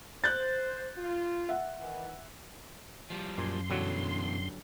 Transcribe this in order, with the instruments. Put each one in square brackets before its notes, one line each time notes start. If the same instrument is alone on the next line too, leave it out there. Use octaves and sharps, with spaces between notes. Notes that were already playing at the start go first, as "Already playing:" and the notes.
[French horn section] C5 [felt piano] F#6 G6 A6
[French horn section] F4
[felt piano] E5 F#5
[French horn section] D#3 E3
[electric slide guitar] F3 G3
[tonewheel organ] F#2 C6 [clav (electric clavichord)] A#2
[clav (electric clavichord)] G2 D3 F#3 [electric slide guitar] B2 E3